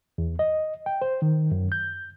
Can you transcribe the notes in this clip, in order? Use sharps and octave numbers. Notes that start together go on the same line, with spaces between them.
E2
D#5
G5
C5
D#3
F#2
G6